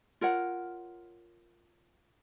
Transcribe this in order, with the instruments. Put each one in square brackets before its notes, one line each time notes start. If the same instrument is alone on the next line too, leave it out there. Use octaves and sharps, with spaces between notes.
[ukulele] F4 A#4 C#5 F#5